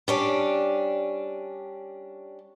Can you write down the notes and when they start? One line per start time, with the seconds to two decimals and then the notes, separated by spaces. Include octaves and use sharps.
0.08 G3 C#4 D4